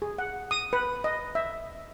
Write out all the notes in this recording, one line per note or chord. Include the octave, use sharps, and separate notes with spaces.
G#4
F#5
D#6
B4
D#5
E5